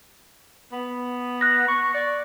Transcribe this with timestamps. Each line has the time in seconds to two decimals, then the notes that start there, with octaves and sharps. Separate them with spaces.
0.72 B3
1.41 F#6 A#6
1.68 C#6
1.94 D5